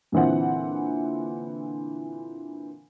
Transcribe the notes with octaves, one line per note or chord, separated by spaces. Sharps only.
A#2 D3 E3 C4 F#5